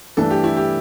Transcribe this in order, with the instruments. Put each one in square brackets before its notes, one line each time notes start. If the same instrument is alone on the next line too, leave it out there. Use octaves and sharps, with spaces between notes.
[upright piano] G2 E3 A3 D4 [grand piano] A4
[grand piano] G4
E4
G4